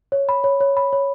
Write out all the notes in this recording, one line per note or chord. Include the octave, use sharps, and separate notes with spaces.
C#5
B5
C#5
C#5
B5
C#5